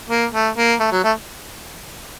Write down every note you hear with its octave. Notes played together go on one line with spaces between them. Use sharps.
A#3
A3
A#3
A3
F#3
A3